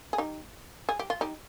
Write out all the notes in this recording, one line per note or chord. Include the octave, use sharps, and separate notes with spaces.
G#4
D#4 G4
G#4
G4
F4
D#4 G4